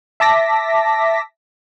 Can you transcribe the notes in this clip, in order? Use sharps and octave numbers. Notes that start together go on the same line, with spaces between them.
E5 A5 D6 A#6 B6